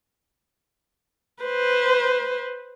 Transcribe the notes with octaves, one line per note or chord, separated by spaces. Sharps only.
B4 C5